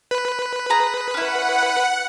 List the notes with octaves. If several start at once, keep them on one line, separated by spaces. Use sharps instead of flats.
B4
G#4 A#5
C#4 E4 F#5